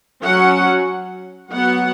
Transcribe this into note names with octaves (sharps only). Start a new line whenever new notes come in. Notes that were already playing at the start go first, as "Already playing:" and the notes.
F#3 C#4 F#5
F#3 B3 F#5